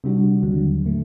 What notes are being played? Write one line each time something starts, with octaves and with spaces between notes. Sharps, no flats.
C3 G3 D4 F#4
D#2 D3 F#3
A2 A3